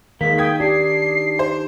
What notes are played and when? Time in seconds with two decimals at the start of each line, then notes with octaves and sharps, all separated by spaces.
0.21 D#3 G#3 A#3 B6
0.38 G5 D#6 G#6 B6
0.60 D4 G4 C7
1.39 C5